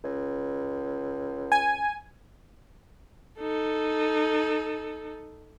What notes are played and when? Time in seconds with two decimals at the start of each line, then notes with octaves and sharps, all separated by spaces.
0.04 C#2
1.52 G#5
3.40 D#4 A4